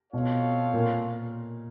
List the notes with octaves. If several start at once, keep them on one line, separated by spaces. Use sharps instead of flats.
B2 C4 F4 A4 C#5 F5
A#2